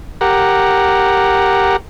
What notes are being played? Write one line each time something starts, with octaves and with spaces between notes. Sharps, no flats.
G4 A#4 F#5